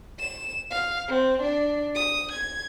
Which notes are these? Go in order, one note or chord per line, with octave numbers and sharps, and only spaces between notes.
E7
F5
C4
D4
D#6
G#6